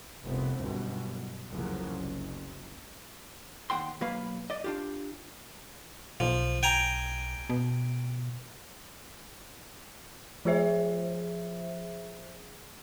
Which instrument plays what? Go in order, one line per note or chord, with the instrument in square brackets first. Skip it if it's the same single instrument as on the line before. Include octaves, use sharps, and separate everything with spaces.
[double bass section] F1 C2 A2 B3 C4
G1 F#2 B2 G3
F1 C2 C#3 F3 F#3 A#3
F#1
[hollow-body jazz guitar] D#2 F3 F#5 G5 C6
B1 F#3 A#3 B4 F5 B5
D5 D#5
D4 F4 G4
[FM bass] B1 [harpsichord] F3
[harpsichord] G5 G#5 A#5
[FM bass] B2
[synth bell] F3 F4 G#4 C5 E5